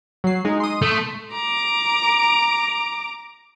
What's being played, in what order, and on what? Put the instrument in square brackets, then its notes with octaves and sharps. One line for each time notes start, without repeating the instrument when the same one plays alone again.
[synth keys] F#3 C7
G#3 D#4
C6 D#6
[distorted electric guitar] A3
[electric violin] A#5 D6